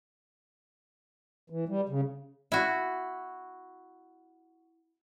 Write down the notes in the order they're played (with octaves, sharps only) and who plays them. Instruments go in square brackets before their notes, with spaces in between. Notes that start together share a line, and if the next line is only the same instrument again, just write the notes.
[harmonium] E3
G3
C#3
[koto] E4 F#4